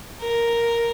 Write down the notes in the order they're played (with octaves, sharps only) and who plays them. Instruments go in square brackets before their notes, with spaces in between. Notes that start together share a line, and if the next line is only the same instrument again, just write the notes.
[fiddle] A#4